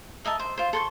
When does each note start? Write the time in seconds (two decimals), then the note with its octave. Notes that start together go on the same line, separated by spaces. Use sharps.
0.25 A#4 D#5 E5 A5
0.39 C5
0.58 F4 C5
0.73 A4 C6 C#6